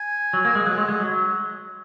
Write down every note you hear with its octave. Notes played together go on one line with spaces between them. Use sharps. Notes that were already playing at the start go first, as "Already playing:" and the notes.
Already playing: G#5
F#3
A#3
G#3
F#3 F#5
G#3
G#3
F#3